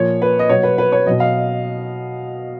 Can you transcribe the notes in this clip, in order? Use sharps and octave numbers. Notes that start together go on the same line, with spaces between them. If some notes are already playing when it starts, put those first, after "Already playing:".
Already playing: A#2 F3 C#5
B4
D#5
B2 F#3 C#5
B4
B4
C#5
B2 F#3 D#5
F5